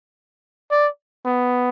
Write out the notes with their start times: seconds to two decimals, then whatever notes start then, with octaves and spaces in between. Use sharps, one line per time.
0.71 D5
1.26 B3